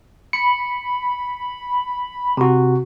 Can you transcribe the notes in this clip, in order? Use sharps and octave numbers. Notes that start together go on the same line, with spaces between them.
B5 C#7
C3 F#4